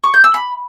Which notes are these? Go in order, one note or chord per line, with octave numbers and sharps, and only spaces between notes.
C#6
G6
E6
B5